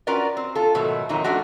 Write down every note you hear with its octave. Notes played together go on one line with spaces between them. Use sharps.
C#4 F4 F#4 A#4 B4 D5
C4
F4 A4
G#2 B2 D#3 F#3 A3
F2 A#2 D#3 F#3 D#4
F3 A3 C#4 D4 F#4